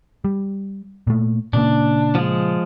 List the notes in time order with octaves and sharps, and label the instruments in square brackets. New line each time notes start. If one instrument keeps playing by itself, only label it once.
[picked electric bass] G3
A#2 A3
[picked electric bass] A#2 C#3 A#3 [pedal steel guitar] D4
[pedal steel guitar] F3 G#3